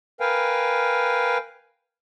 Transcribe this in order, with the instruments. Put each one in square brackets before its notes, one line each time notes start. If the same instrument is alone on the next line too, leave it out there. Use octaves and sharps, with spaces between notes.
[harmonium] A#4 B4 F5 G5 G#5